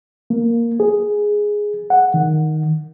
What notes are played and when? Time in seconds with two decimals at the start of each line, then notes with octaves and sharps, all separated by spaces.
0.30 A#3
0.80 G#4
1.90 F#5
2.14 D#3